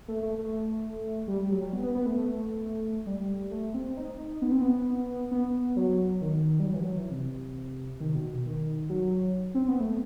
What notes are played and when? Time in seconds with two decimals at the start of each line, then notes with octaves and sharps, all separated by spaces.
0.08 A3
0.23 A3
0.38 A3
1.28 G3
1.50 F#3
1.62 G3
1.73 B3
1.83 B3
1.95 B3
2.06 A3
2.17 A3
3.06 G3
3.51 A3
3.74 C4
3.97 D#4
4.42 B3
4.52 C4
4.61 B3
5.31 B3
5.76 F#3
6.21 D#3
6.60 G3
6.66 F#3
6.74 E3
6.81 F#3
6.95 E3
7.11 C3
8.00 D#3
8.15 B2
8.46 D#3
8.90 F#3
9.55 C4
9.68 B3
9.80 A3